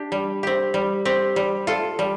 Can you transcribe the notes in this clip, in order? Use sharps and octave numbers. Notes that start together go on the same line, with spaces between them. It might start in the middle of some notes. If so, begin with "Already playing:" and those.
Already playing: D4 G4
G3
C4 G4
G3
C4 G4
G3
F4 A4
G3